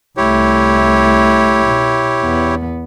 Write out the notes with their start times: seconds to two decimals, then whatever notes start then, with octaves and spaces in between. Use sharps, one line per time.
0.17 C2 A3 E4 G4 C#5
1.66 B2
2.23 E2 B3